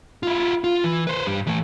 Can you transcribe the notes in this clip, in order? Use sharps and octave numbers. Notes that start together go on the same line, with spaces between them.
E4 F4
F4
E3
B4 C5
G2 G3
E3 A3